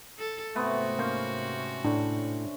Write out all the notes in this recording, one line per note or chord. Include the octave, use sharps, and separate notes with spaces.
A4
G#2 C3 A3 B3 C4 F#4
A#3 C#4 C5
A2 D4